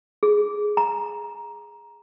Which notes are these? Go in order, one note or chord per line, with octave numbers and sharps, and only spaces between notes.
G#4
A#5